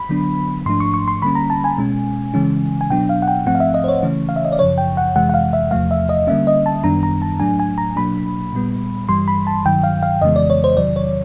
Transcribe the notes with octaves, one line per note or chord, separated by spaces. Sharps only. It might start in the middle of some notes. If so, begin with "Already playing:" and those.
Already playing: B5
D3 F#3 B3 D4
G#2 F3 A3 D4 C6
C#6
C#6
C6
D3 G3 A#3 C#4 B5
A#5
A5
G#5
B2 G#3 C#4
C#3 E3 G#3 C#4
G#5
B2 F#3 B3 D4 G5
F5
F#5
G5
G#2 F3 A3 C4 F#5
F5
E5
D#5
C5
C#5
C#3 E3 A3 C#4
F5
E5
D#5
D5
F#2 C#3 F3 C#5
G5
F#5
F2 C3 E3 G#3 F#5
F#5
F5
E5
E2 C3 F3 A3 F5
E5
D#5
D3 G3 A#3 C#4 E5
D#5
A5
F#2 D#3 G3 B3 D4 A#5
A#5
A5
A2 F#3 A3 D4 G#5
G#5
A#5
B2 F#3 A#3 D4 B5
A#2 G3 B3
G2 E3 G3 C6
B5
A5
G2 D#3 F#3 G5
F5
F5
F2 C#3 E3 G#3 B3 D#5
D5
C#5
C5
E2 C3 D#3 F#3 D5
C#5